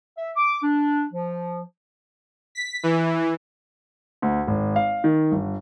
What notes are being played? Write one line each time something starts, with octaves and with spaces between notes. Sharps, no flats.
E5
D6
D4
F3
B6
E3
D2
G#1
F5
D#3
G1